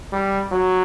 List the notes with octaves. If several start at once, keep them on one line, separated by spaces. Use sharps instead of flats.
G3
F#3